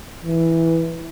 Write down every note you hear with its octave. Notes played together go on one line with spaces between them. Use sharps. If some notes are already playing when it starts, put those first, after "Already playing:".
E3